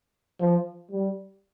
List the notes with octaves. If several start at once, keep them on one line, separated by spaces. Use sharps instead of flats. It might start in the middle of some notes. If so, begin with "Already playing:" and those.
F3
G3